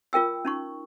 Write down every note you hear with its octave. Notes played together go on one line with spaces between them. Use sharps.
F4 A#4 G5 E6
C#4 D#4 C#6